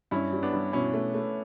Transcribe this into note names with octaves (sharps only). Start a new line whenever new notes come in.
G2 C#4 E4
G3
B3 D4
G2
B2 C#4 E4
A3
A3